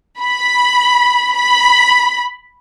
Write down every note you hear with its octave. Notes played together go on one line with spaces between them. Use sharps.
B5
B5